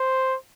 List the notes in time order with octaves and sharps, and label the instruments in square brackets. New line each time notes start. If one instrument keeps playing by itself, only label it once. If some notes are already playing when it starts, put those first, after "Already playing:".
Already playing: [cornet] C5